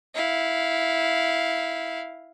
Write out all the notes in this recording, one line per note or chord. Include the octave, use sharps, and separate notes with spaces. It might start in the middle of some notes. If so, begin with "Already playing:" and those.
E4 F5